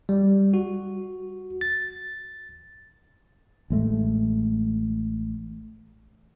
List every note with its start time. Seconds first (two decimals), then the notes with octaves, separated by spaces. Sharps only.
0.09 G3
0.54 F#4
1.61 A6
3.70 A1 G#3 A3